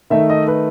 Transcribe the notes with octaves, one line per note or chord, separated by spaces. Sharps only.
D#3 A3 D#4 E5
D#5
B4